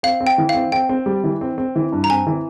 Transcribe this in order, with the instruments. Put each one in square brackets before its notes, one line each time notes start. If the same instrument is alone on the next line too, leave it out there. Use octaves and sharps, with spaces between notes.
[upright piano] C4 [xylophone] F5
[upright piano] C4
[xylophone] G5
[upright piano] E3
[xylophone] F5
[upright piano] C4
[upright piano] C4 [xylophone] G5
[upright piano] C4
G3
E3
C4
C4
E3
G2
[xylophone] A#5
[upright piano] C4 [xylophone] G#5
[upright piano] E3